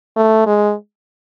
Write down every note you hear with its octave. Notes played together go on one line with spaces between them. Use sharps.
A3
G#3